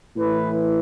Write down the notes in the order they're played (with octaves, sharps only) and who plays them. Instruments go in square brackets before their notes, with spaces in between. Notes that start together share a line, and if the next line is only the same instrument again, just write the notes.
[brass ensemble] A2 E3 B4